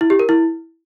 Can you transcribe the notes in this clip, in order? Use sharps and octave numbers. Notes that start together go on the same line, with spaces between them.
E4
G4
A#4
E4